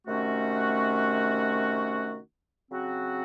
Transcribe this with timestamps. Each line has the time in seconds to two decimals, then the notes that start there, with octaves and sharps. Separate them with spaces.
0.06 C3 D#3 A3 C#4 F#4
2.70 C#3 F#3 C4 F#4